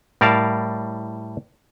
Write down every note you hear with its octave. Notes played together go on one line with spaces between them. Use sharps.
A2 G3 A#4 D5 F5 A5